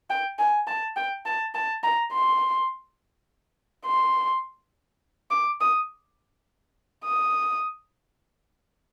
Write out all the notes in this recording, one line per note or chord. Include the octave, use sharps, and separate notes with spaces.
G5
G#5
A5
G5
A5
A5
A#5
C6
C6
D6
D#6
D#6